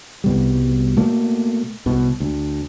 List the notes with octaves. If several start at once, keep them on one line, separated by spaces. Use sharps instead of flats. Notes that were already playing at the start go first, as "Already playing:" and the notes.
C2 B2 G3
B2 A3 A#3
C2 B2
D2